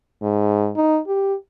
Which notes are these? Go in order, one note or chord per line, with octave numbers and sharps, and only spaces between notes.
G#2
D#4
G4